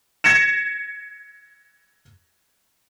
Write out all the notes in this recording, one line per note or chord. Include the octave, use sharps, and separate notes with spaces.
G#6 A#6 C#7 E7